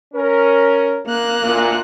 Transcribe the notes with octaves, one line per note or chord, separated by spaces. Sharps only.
C#4 A#4
A#3 F#6
D2 A#2